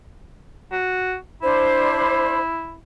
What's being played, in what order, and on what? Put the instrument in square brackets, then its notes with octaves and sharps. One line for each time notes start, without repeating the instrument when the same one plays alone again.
[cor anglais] F#4
[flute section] D4 C5 B5 [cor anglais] E4